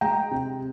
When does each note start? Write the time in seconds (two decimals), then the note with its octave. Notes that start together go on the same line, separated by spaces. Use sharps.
0.01 G#3 G5 A#5
0.31 C3